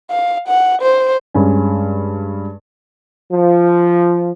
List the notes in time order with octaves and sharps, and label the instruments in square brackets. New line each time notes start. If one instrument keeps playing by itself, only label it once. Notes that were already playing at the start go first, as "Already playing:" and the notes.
[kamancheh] F5
F#5
C5
[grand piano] G2 G#3 C#4
[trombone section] F3